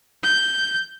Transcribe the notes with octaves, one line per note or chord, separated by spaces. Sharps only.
G6